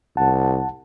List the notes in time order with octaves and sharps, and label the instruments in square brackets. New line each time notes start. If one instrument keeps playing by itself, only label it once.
[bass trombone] C2 [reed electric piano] F#5 A5